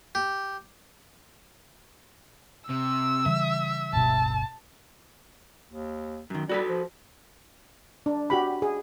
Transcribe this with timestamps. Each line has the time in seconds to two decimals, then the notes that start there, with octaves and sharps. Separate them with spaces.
0.15 G4
2.69 C3 E6
3.26 C#3 E3 G3 E5
3.93 D1 G1 B2 A5
5.71 D#2
6.30 F#2 D#3
6.49 G3 F#4 A4 B4
6.68 F3
8.06 D4
8.30 F#4 G4 B5
8.62 G#4